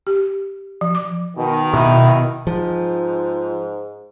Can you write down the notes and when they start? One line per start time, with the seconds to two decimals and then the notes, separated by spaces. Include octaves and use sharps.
0.07 G4
0.81 F3
0.95 D6
1.37 B2 D#3
1.74 B2 E4
2.47 G#2 F3